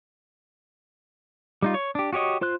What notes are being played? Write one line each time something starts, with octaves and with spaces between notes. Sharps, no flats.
G3 D#4 F4
C#5
D4 G4
F#4 G4 C#5 D#5
F4 C5 C6 F#6